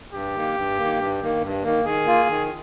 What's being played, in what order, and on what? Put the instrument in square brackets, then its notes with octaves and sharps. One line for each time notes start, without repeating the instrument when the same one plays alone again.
[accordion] G2 [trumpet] G4
[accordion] D#3 A#3
G2
D#3 A#3
G2
D#3 A#3
G2
D#3 A#3
[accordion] D#3 [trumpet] G#4
[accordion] A#3 F4
D#3